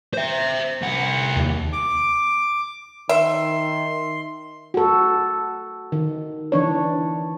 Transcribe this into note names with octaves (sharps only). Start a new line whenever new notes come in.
C5 E5
C2 F#5
D#2
D6
D#3 E5 C6
F#4 A4
D#3
E3 D4 C#5